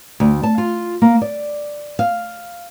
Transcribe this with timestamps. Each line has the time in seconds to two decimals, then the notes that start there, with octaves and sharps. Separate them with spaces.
0.20 D2
0.43 A5
0.58 F4
1.02 A#3
1.22 D5
1.99 F5